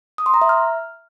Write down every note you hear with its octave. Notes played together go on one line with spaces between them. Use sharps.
D#6
C6
A#5
E5
F6